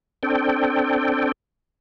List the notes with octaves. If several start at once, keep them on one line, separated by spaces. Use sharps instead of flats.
C4 D4 A4 G5